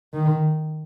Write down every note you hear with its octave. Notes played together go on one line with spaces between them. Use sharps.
D#3